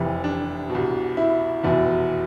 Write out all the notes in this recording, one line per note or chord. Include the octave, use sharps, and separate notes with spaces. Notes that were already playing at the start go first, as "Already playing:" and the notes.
Already playing: F1 F2 C3 E3 E4
D4
B2
C2
E4
F1 E2 B2 E4